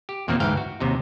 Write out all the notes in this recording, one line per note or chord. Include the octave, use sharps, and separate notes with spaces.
G4
E2 A#2 D#3 A#3 C4 D#4
D2 G#2 E3 F5 G5
F#4
D#2 C3 D#4